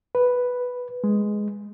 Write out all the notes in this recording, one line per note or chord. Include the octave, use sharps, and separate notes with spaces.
B4
G#3